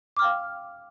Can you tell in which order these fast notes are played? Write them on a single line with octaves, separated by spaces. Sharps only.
D6 F6 G5 F5